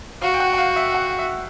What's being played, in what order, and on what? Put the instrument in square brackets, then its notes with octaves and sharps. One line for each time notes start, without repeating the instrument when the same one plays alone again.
[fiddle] F#4 [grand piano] F5
[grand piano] G5
F#5
F#5
F5
E5
F#5
E5